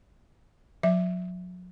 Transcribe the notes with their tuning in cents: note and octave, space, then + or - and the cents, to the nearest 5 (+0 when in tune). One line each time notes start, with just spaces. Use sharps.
F#3 -35 E5 +0